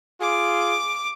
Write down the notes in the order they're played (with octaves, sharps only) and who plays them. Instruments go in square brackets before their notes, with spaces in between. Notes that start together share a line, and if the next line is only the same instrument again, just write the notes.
[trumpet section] F4 G#4 [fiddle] D6